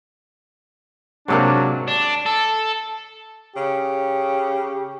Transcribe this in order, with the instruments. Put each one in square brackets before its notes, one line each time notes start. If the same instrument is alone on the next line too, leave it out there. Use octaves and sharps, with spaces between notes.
[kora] G#2 C3 A#3 [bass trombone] F#3 [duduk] D4
[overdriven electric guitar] D4
A4
[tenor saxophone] C#3 [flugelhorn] G4